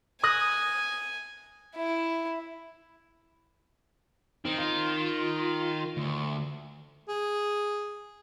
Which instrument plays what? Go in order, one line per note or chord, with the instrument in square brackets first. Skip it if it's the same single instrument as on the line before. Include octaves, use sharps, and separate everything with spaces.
[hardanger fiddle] G#5 [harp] D#6 F#6 A#6
[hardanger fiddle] E4
[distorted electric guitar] D#3 [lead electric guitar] C4
[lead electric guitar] F4
D2
[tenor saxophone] G#4